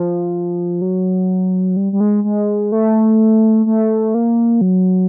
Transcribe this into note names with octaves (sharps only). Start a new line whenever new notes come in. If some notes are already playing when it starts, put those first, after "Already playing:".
Already playing: F3
F#3
G3
G3
G#3
G#3
A3
A3
A#3
F#3